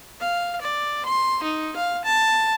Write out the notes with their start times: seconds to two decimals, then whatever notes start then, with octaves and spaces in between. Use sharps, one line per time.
0.20 F5
0.61 D5
1.06 C6
1.43 D#4
1.76 F5
2.04 A5